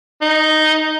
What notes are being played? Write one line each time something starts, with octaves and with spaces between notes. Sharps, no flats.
D#4